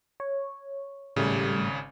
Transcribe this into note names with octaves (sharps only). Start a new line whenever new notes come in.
C#5
G#1 A2 C#3 G3 A3